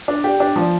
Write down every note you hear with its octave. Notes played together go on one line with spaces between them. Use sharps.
D4
G4
D4
F3